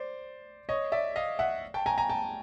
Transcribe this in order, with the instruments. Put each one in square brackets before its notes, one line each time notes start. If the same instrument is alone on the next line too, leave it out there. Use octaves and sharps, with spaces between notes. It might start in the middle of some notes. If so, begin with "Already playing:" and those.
Already playing: [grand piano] C5 D5
C#5 D#5
D5 E5
D#5 F5
E5 F#5
G5 A5
G#5 A#5
G#5 A#5
G5 A5